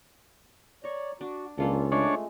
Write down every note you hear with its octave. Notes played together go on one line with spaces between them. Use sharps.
C#5 D5 A#5 C#6
D4 F#4
C#2 A#3 C#4 D4 F4 A4
G#3 A3 D4 C#5